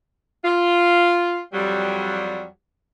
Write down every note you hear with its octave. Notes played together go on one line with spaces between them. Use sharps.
F4
F2 F#3 G3